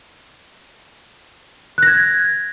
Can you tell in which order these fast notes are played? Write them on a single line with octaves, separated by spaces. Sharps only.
F#6 A#6 G#6